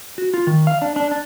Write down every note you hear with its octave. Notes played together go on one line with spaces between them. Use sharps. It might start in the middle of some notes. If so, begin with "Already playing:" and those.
F#4
F4
D#3
F5
D4
D4
D4